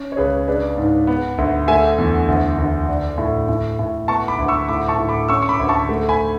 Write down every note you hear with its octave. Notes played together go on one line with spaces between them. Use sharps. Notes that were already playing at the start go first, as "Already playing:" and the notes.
Already playing: C#4
C#5
C#2 G#4 B4
D4 G#4 B4
G#2
B3
D2
A3 E5 G#5
E2
D2
D2
D4
A2
A2
A2
B3 A5 C#6
B5 D6
D2
C#6 E6
A2 B5 D6
A5 C#6
A2
B5 D6
C#4 C#6 E6
C#6
B5 D6
D2
A5 C#6
A3
G#5 B5